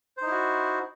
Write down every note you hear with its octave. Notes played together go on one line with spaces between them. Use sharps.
D#4 E4 F#4 C5